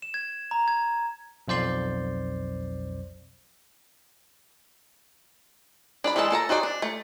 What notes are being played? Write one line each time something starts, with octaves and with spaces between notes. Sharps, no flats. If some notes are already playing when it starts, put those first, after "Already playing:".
E7
G#6
A#5
G#6
B1 F2 C5 D5 C6
D4 D5 B5
E3 G3 G#3 A4 A5
A#3 A4 A5 A#5
D#4 F#4 G#4 C5 D5
D4
A3